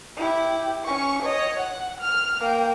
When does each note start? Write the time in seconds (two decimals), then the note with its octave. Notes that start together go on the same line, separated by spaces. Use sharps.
0.17 E4 G4
0.85 C#4 C#6
1.23 C#5 D#5
1.60 F#5
2.01 F6
2.41 A#3 G5